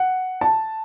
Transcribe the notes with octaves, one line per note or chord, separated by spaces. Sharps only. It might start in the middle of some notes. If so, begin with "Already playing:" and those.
Already playing: F#5
A5